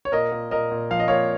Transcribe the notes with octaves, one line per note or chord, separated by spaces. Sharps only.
C#5
A#2 A#4 D#5
A#2
A#2 A#4 D#5
A#2
F3 F5
D#5
A#2 C#5 F5